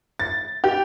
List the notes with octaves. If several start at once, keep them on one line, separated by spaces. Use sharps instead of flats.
A6
G4